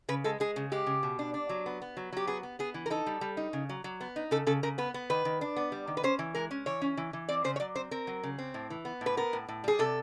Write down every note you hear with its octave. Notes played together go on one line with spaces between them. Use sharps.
C#3 B4
G#3 A4
G#3 G#4
C#3
G#3 G4
C#3
B2
D4
D4
F#3
B3
B3
F#3
F#3 G4
B3 G#4
B3
B3 G#4
E3
A#4
D#4 A4
G3
G3
D#4
C#3
F#3
F#3
B3
D#4
C#3 A4
C#3 A4
C#3 A#4
B3 B4
B3
D#3 B4
D#3
D4
B3
G3
D#3
B4
C#4 C5
E3
G#3 A#4
C#4
E3 C#5
C#4
E3
E3
C4 D5
C#3 C5
C#5
F#3 D5
C4 C5
C4 A#4
F#3
C#3
C4
A2
E3
B3
A2
B4
B3 A#4
A2
A2
G3 G#4
C3 A4